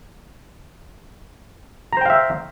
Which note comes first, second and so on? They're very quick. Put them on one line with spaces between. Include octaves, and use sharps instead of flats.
A#5 C5 G5 F5 E5